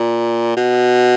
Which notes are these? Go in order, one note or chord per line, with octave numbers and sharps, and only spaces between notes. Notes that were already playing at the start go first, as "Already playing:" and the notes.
Already playing: A#2
B2